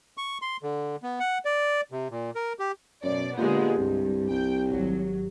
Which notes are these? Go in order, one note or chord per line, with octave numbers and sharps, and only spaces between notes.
C#6
C6
D3
B3
F#5
D5
C3
A#2
A#4
G4
F#2 B2 C#5 D5
A#2 D3 G#3 B3 G4
C2 G2
C2 G5
G#1 F#3